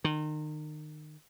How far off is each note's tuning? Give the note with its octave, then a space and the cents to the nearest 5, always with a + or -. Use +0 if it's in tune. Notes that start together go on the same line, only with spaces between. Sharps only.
D#3 -30